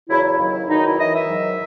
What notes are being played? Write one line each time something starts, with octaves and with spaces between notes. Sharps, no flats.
E2 C#3 F#3 E4
E4
D#2 C#3 F#3
E2 D#3 F#3 D#4
E4
F#2 E3 D#5
E5
G#2 D#3 F#3